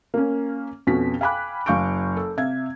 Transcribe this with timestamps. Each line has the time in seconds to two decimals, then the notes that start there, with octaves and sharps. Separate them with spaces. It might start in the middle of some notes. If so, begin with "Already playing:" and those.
0.14 A#3 C#4
0.87 F2 B2 C#4 F#4 B6
1.21 F5 G5 G#5 B5 D6 F#6
1.66 F#1 F5 G#5 C#6 G6 D7
2.17 A4
2.37 C3 E5 F5 G#6